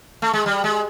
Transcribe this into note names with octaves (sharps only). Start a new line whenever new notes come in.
A3
G#3
G3
G#3